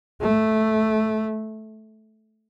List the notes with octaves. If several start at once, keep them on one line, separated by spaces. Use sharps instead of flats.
A3